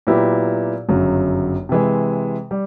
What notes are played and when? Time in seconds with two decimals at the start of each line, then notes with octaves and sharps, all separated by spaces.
0.07 A#2 F#3 B3 E4 G4
0.89 G1 F#2 C#3 F#3
1.69 C3 E3 G#3
2.51 G3